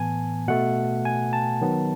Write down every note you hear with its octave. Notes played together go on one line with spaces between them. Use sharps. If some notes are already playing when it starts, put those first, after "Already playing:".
Already playing: A2 E3 B3 G#5 A5
B2 A3 F#5
G#5
A5
D#3 F#3 B3